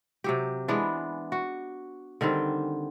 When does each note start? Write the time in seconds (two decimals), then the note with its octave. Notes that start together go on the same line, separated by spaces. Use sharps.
0.24 C3 F#3 G4
0.68 E3 G#3 B3 D4
1.32 F#4
2.21 D3 D#3 G3 C4